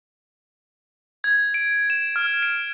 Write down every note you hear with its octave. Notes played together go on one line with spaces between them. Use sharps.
G#6
D7
E7
F6
D7